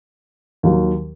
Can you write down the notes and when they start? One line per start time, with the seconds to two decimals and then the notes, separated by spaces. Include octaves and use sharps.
0.63 D#2 D#3 F#3